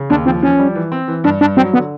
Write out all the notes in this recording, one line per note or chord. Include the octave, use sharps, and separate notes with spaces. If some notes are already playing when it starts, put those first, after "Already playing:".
Already playing: C#3
D#2 D4
F3 C4
F3 C#4
G3
E3
C4
E3
G2 D4
G2 D4
F#3 C4
D3 B3